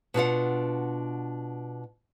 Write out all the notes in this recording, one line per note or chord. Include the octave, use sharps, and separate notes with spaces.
B2 D4 F4 F#5